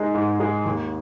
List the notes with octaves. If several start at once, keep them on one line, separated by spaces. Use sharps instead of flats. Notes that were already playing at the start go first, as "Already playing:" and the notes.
Already playing: G#3 D#4 G#4
G#2
G#3 D#4 G#4
D#2